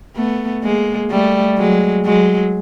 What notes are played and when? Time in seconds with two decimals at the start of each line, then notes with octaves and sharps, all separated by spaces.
0.16 A3 B3
0.63 G#3 A#3
1.11 G3 A3
1.58 F#3 G#3
2.05 F#3 G#3